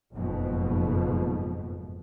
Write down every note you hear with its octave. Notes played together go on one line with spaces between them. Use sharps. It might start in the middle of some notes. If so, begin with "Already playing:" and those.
F#1 F2 G#2 B2